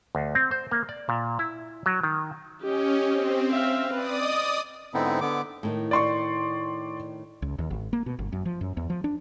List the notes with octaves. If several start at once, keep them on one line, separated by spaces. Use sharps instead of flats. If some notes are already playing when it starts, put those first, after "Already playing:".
D2
C4
C5
A#3
D5
A#2
E4
F#3
D#3
C#4 G4 D#5
C4
E5 F5
B4 D5 D#6
D#5
G#2 D3 B3 C4 D#4 E4
D3 B3 D6
A2 D#3
D5 C6 C#6
C#2
D#2
G#1
A#3
B2
G1
F#2
F3
F#2
E2
F3
D4